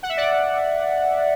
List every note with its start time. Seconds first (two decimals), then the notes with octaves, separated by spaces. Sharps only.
0.03 F#5
0.09 E5
0.17 D5 F#5